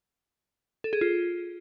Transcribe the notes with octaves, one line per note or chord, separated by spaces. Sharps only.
A4
G#4
F4